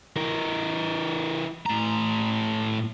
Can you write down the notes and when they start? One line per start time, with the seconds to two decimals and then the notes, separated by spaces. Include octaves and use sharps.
0.16 E3 A#4
1.66 A2 A#5